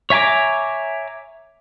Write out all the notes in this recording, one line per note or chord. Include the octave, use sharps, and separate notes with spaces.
C#5 E5 G#5 A#5 D6